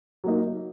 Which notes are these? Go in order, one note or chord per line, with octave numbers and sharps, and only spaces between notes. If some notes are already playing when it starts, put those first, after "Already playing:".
F#3 A#3 D#4